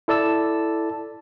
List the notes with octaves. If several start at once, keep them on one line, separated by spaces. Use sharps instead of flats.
E4 A4 D5 A5 E6